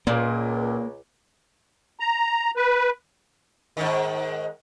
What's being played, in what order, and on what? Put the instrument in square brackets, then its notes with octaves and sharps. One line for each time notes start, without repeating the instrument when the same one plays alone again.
[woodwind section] C#2 [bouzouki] A#2 [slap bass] A#3
[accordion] A#5
B4
[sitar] G#2 D#3